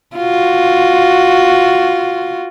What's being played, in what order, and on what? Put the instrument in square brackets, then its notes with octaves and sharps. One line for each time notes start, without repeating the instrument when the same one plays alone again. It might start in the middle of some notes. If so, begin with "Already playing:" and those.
[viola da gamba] F4 F#4